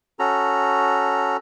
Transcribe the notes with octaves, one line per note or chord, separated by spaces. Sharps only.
C#4 F#4 A4 A#5